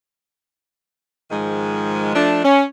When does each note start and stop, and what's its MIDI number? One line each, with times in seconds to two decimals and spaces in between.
1.30 2.15 44
1.30 2.15 51
1.30 2.15 53
1.30 2.15 56
2.15 2.40 53
2.15 2.40 57
2.15 2.40 62
2.44 2.64 61